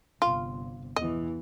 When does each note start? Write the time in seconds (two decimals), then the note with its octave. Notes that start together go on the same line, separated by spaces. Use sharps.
0.22 G1 C3 F4
0.96 E2 E3 D#5